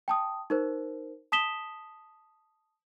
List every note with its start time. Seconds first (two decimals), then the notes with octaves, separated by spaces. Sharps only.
0.08 G5 A5 D#6
0.50 D#4 A#4 C5
1.32 A5 D#6 B6 E7 G7